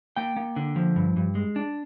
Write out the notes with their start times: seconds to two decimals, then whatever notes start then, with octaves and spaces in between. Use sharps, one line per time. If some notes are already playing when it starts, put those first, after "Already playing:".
0.16 A#3 G5
0.36 A#3
0.56 D3
0.76 F3
0.96 G2
1.17 G2
1.35 G#3
1.56 D4